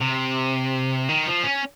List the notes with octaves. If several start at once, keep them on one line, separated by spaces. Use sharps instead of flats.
C3
D#3
F3
C#4